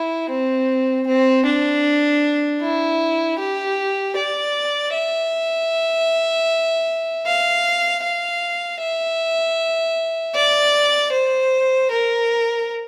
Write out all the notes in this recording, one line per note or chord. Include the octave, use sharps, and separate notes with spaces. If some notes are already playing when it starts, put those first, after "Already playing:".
Already playing: E4
C4
C4
D4
E4
G4
D5
E5
F5
F5
E5
D5
C5
A#4